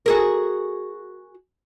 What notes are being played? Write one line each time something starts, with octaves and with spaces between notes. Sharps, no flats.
F#4 G#4 A#4